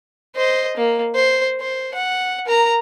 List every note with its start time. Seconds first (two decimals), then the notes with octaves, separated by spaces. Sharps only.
0.36 C5 D#5
0.77 A#3
1.15 C5
1.61 C5
1.94 F#5
2.46 A#4 A#5